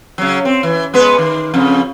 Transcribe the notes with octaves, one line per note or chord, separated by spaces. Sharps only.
C#3 F#3
C4
E3
G#3 B3 B4
D#3
F2 C#3